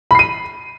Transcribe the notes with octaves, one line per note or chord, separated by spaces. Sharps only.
B5 C7 D#7